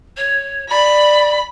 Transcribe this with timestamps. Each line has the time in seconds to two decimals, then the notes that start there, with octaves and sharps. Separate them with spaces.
0.17 C#5
0.69 D5 B5